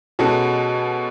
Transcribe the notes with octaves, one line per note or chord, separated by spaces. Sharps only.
B2 G#3 C#4 F#4 A4